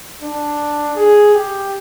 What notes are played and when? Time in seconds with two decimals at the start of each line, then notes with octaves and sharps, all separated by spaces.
0.22 D4
0.96 G#4
1.34 G4